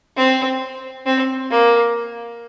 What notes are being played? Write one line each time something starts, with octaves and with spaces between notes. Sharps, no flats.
C4
C4
A#3